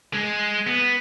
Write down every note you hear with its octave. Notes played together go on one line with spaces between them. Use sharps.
G#3
B3